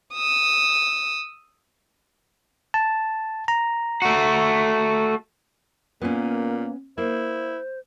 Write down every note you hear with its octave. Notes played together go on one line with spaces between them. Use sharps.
D#6 E6
A5
A#5
A3 F#4
A#2 A#3 B3 C#4
A#3 E4 C5